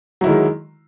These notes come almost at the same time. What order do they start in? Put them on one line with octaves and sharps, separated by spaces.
F#3 E4 D#3 G#3